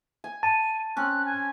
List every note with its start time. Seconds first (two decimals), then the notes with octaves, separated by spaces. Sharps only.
0.24 G#5
0.43 A5 D#7
0.97 C4 C#4 F#6
1.25 G#5